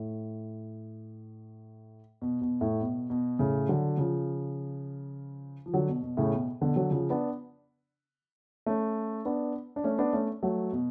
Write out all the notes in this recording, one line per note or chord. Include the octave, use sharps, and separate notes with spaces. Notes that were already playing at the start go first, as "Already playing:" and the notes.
Already playing: A2
B2
B2
A2
B2
B2
A2 C#3
D3 F#3
C#3 F3
F3
D3 F#3
B2
B2
A2 C#3
B2
B2 D3
D3 F#3
C#3 F3
B3 D4
A3 C#4
B3 D4
D4
A3 C#4
B3 D4
A3 C#4
F#3 A3
B2